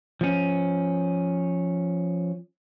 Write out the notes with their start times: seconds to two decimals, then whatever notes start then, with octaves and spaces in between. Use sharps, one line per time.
0.21 F3 C#4